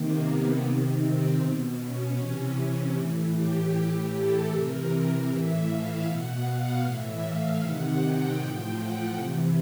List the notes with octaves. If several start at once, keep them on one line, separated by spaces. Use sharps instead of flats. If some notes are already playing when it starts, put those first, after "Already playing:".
Already playing: C3 D#3 A#3
B3
C3 D#3
C4
B2
C#4
C3 E3 C#4
C#4
A2 E3
G4
A2 E3 G4
A4
C3 E3 A#4
A2 E3 E5
F5
B2 F#5
F5
A2 E3 E5
F5
C3 D#3 F#5
G5
A2 F3 G5
F#5
C3 E3